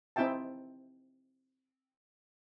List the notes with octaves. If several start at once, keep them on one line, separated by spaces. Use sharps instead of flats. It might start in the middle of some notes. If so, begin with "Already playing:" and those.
C4 D#4 E4 E5 G5 A5